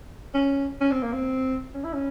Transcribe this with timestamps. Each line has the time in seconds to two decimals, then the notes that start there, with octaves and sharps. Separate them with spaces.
0.34 C#4
0.81 C#4
0.91 C4
1.02 A#3
1.13 C4
1.74 C#4
1.84 E4
1.94 C#4